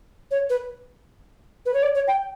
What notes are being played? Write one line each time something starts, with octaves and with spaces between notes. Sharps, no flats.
C#5
B4
B4
C#5
D5
C#5
G5